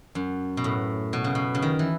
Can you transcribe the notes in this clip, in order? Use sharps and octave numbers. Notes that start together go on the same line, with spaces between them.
F#2
B2
A2
B2
C#3
B2
C#3
D#3
E3